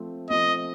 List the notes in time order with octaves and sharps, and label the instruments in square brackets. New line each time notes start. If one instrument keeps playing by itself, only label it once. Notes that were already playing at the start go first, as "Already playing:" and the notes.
Already playing: [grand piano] F3 A3 C4
[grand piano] F3 A3 C4 [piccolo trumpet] D#5